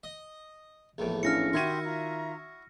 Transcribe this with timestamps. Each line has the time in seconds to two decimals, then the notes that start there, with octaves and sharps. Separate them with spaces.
0.03 D#5
0.98 A#1 E2 A2
1.23 C#4 D4 E4 F5 F6 A#6 C#7
1.53 D#3 E4 F#4 G4 E5 C6 G#6 D#7
1.83 F4 E5 A#5